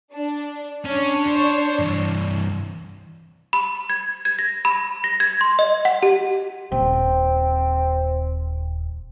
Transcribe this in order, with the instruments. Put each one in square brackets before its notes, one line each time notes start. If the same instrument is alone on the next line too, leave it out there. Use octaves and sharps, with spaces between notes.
[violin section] D4
[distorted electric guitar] C#4 [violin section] D4 C#5
[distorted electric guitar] C5
G2 E3
[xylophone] B5
G#6
G#6
A#6
B5
A#6
G#6
C6
D#5
F#5
G4
[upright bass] D#1 [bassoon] C4